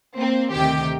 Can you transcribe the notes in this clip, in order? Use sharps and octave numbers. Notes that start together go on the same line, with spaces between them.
A#3 C4
D2 C3 D#3 G4 G5